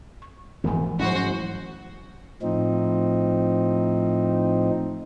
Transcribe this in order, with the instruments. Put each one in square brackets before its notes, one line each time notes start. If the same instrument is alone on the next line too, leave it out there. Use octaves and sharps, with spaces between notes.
[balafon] C#6
[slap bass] E1 G#2 B3 [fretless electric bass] E3 F3 A3 [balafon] A#4 G#5
[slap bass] G#2 G#3 C#4 [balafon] F#3 E4 [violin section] F#4 C5
[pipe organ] A2 F3 C4 D#4